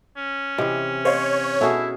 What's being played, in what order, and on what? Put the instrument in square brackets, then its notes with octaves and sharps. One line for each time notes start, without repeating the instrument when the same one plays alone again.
[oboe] C#4
[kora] C3 E3 [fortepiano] D#5
[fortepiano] C5 D#5 F5 [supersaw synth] C#5
[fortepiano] B2 A4 E5 [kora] C#4 F#4 G#4 [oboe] E4